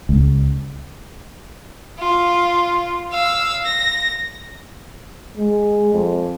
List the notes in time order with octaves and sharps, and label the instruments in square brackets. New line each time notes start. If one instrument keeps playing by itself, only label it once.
[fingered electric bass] C#2
[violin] F4
F5 E6
A#6
[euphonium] G#3
F2